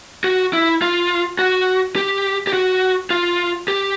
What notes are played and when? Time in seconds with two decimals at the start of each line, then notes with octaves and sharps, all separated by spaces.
0.24 F#4
0.53 E4
0.82 F4
1.39 F#4
1.96 G4
2.47 G4
2.53 F#4
3.10 F4
3.68 G4